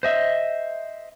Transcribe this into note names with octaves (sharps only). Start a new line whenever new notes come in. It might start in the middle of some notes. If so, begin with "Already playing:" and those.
C5 D#5 E5